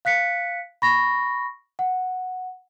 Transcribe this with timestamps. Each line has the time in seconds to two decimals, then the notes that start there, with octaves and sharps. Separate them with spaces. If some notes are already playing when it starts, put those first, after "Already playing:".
0.05 F5 F#6 B6 C#7
0.82 B5 C#6 A#6
1.79 F#5